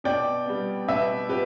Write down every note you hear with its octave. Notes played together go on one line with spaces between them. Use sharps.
B2 D5 G5
G3 B3
B2 B4 E5
B3 G4 B4